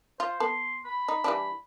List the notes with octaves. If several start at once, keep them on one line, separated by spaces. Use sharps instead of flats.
F4 C5
B3 A4 C6
B5
D#4
E3 G3 D4